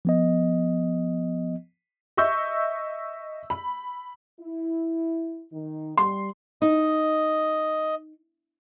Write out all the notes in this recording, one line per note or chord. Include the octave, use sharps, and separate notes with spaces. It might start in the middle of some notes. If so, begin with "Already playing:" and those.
F3 B3 D#5
D#5 E5 C#6 E6 G6
B5
E4
D#3 D#4
G3 C6
D#4 D#5